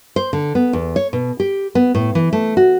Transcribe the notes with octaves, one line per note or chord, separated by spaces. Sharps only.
C5
D3
B3
E2
C#5
B2
G4
B3
A2
E3
A3
F#4